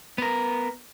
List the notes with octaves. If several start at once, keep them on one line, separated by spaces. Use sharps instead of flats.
B3 A#4